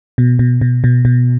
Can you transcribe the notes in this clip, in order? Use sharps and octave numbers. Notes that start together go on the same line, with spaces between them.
B2
B2
B2
B2
B2